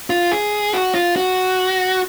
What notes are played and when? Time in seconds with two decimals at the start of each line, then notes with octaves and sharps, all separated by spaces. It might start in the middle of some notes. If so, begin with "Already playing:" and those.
0.10 F4
0.32 G#4
0.73 F#4
0.95 F4
1.16 F#4